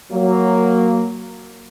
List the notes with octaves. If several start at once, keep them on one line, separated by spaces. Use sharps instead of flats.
F#3 A#3